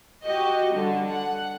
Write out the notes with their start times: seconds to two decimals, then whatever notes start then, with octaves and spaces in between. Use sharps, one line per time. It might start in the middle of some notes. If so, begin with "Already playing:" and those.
0.25 F#4 G4 D#5
0.72 D3 G3
1.10 F#5